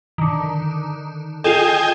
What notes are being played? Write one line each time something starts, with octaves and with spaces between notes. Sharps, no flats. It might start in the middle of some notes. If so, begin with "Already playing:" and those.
D3 D#3
F4 G#4 A4 D#5 G5 G#5